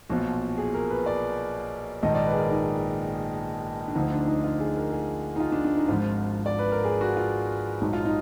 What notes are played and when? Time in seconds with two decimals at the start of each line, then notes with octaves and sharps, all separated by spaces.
0.10 B1 A#2 F3 F#4
0.58 G#4
0.74 A#4
0.90 B4
1.06 D5
2.02 A#1 G#2 D#3 D#5
2.15 D5
2.27 B4
2.32 G#4
2.38 A#4
2.51 D#4
3.88 D4
3.95 D2 D3 F3 D#4
4.12 D4
4.27 D#4
4.44 F4
4.60 G#4
4.76 A#4
4.92 G#4
5.36 D#4
5.40 F4
5.52 D4
5.65 D4
5.77 D#4
5.88 G#1 G#2 F3 F4
6.46 D5
6.59 B4
6.72 A#4
6.84 G#4
7.01 F#4
7.17 F4
7.81 A#1 G#2 F#3 D#4
7.93 F4
8.05 D#4